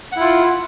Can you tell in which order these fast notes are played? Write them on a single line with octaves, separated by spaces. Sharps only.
F#5 E4 F4